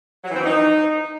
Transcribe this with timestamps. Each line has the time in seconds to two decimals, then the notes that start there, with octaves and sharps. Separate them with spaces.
0.24 F#3
0.29 E3
0.35 C4
0.40 E3
0.45 D#4